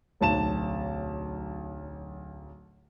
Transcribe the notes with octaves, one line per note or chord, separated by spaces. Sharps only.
D1 B1 A5 E7